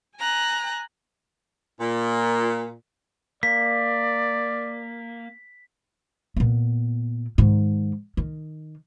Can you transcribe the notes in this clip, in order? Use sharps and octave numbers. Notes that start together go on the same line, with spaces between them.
G#5 A#5 F#6
A#2
A#3 D5 B6
A#2 B3
G#2 D#3
D#3